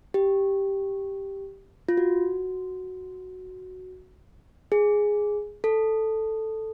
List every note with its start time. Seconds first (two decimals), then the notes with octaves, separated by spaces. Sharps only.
0.14 G4
1.89 F4
1.97 F#4
4.72 G#4
5.64 A4